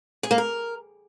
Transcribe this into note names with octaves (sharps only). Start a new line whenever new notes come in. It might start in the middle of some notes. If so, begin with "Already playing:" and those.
G#4
A#3
A#4